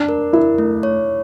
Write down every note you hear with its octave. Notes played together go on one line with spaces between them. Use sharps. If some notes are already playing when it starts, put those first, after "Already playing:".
Already playing: D4
A#4
E4 A#4
A3
C#5